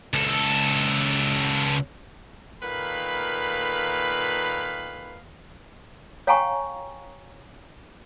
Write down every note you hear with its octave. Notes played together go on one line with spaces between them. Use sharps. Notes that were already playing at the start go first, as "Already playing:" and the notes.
C#2 A4
A#2 D#3 A4 B4 F5 B5
C#5 F5 G5 G#5 A#5 C#6